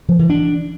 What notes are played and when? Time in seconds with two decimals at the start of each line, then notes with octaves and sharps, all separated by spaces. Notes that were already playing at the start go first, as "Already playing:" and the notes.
0.09 F3
0.19 E3
0.30 D4